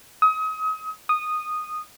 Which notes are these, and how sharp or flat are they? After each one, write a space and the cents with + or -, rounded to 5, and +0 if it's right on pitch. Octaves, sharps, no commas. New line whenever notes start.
D#6 +35
D#6 -10